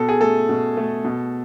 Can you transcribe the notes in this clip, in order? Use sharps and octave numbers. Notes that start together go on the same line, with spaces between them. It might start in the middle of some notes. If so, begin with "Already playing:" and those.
Already playing: B2 A4
G#4
A3 A4
B2
A3
B2